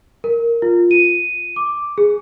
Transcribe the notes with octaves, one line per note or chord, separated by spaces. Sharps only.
A#4
F4
D#7
D6
G#4